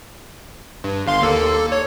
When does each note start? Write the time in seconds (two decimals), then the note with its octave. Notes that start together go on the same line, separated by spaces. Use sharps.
0.84 G2
1.07 G1 F5 C6
1.22 D#2 A#3 A4
1.55 A4
1.72 C#5